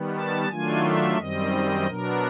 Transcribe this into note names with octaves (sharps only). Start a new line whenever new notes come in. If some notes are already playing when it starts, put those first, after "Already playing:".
Already playing: D#3 G3 B3
A5
D#3 F#3 A3 D4 F4 G#5
E5
F#2 D#3 G3 C4 D#5
B2 F#3 B3 D4 A#4